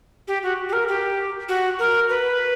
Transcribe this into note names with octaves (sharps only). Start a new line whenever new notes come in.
G4
F#4
G4
A#4
G4
F#4
A#4
B4